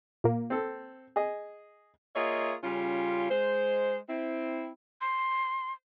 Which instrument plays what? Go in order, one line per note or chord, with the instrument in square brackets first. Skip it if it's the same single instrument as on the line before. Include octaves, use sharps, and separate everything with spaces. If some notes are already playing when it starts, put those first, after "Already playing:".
[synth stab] A#2 A#3
[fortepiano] C4 A4
G#4 D#5
[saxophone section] A#3 F4 G#4 C#5 D#5 E5
C#3 G3 C#4 F4
G#3 C5
C4 E4
[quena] C6